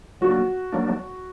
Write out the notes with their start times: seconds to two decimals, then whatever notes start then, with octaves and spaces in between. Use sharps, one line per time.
0.21 F#3 A#3 D4 F#4
0.72 F#3 A#3 D4